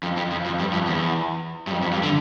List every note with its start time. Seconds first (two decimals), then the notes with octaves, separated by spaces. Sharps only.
0.03 F2
0.17 F2
0.32 F2
0.46 F2
0.59 G2
0.73 F2
0.87 E2
1.67 G2
1.72 F2
1.82 F2
1.93 G2
2.03 D3